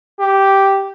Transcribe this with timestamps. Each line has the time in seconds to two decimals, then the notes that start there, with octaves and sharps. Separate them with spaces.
0.20 G4